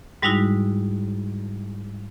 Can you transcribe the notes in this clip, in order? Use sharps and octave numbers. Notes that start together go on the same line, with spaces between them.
G#2 G3 G#3 D#4 E4 F#4